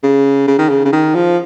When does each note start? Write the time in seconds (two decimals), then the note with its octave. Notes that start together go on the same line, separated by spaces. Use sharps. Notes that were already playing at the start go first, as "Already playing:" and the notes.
0.03 C#3
0.48 C#3
0.58 D#3
0.69 C#3
0.85 C#3
0.92 D#3
1.15 F3